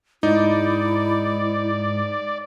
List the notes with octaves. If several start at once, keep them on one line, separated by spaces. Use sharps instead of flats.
G#2 D#4 E4 D5